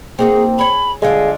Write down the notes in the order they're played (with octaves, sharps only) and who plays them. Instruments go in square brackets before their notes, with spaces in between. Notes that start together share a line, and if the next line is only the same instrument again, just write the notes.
[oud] A#3 D#4 F#4 [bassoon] C4 [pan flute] G#4
[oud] G#4 C#5 [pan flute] B5
[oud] D3 F3 G3 [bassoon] G#3 [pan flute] F5